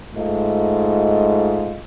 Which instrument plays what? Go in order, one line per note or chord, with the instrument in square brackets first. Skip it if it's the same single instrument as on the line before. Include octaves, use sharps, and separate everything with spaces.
[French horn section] G#2 A3 F4 D#5